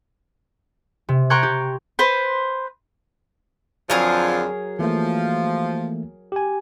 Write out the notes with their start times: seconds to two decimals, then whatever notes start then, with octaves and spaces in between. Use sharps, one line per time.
1.09 C3
1.30 G5 A#5 C6 C#6 F#6 G#6
1.43 G4
1.99 B4 C5
3.90 F2 D3 F3 F#3 G#4 A#4
4.79 E3 F3 A3 A#3
6.32 G4 G#5